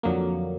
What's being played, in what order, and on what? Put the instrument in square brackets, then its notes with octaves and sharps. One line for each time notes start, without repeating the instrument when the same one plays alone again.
[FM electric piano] F2 D3 F#3 A#3